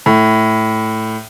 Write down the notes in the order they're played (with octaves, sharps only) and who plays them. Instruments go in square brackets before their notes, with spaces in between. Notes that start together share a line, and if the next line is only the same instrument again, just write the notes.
[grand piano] A2